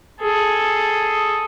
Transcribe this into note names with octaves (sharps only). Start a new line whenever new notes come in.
G#4 A4